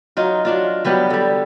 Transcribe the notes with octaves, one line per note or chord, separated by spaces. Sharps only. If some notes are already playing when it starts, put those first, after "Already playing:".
F#3 D#4 F4
F#3 D4 F4
F#3 G3 B3 G4
D3 G3